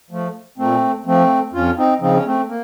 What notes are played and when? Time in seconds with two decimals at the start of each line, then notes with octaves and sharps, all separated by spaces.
0.11 F3 A3
0.58 A#2 A3 C4
1.06 F3 A3 C4
1.53 F2 C#4 F4
1.77 C4 D#4
2.01 C#3 F3 C4 D#4
2.13 C#4
2.25 A3 C4
2.48 A#3